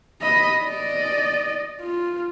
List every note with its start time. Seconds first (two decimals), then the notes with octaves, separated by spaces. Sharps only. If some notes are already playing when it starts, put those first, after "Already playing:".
0.21 D#5 B5
0.63 D5 D#5
1.81 F4